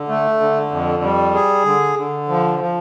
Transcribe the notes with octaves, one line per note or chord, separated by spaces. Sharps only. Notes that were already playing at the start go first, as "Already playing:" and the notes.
Already playing: D3
A3
D3
F2
G3
G#4
D3
D3
F3
F3